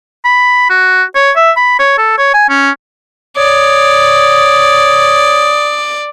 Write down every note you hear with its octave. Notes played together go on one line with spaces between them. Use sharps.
B5
F#4
C#5
E5
B5
C#5
A4
C#5
G#5
C#4
C#5 D5 D#6